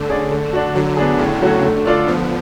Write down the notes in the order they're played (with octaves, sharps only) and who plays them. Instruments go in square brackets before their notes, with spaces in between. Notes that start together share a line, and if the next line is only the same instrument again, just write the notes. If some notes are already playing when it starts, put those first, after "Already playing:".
Already playing: [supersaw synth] D3 [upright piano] A3
[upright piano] C#4 G#4 D5
A3
D4 F#4
[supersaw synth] D3 [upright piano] F#3
[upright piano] B3 D4 G#4
[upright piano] A2 [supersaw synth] C#3
[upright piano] F#3 A3 C#4 F#4
[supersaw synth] D3 [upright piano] A3
[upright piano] D4 F4 A4 D5
[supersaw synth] F3 [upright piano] B3